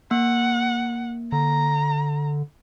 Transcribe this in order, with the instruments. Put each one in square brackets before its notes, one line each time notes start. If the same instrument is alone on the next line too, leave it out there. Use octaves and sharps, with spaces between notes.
[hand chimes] A#3 [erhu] F#5
[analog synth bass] D3 [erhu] A#5